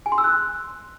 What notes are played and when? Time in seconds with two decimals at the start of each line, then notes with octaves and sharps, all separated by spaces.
0.06 G#5
0.12 C6
0.18 E6
0.24 F#6